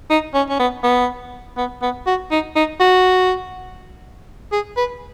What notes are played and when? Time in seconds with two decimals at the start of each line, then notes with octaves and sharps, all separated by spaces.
0.10 D#4
0.34 C#4
0.50 C#4
0.59 B3
0.84 B3
1.57 B3
1.82 B3
2.07 F#4
2.31 D#4
2.56 D#4
2.80 F#4
4.52 G#4
4.77 B4